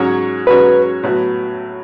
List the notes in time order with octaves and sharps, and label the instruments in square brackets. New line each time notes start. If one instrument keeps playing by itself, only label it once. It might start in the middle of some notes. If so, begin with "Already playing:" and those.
Already playing: [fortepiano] G#2 F#3 C#4 F#4 C#5
[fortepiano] G#2 F#3 C#4 F#4 C#5 [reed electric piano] B4
[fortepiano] A2 F#3 B3 F#4